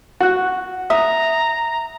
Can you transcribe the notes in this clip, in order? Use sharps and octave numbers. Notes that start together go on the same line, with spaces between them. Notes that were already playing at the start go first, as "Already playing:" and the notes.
F#4 F#5 F#6
E5 A#5 D#6